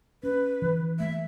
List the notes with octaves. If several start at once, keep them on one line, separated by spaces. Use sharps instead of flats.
C#4 B4
E3
A3 E5